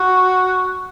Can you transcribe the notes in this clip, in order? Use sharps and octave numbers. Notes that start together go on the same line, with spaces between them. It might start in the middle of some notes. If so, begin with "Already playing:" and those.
Already playing: F#4